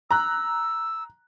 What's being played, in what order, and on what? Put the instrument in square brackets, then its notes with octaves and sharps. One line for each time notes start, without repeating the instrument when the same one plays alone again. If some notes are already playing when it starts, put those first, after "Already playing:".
[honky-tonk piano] A#5 F#6 [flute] E6